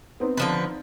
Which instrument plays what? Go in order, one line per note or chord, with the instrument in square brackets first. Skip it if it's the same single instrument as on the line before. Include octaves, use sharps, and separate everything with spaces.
[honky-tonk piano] B3 C4 D#4
[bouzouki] D3 F3 B4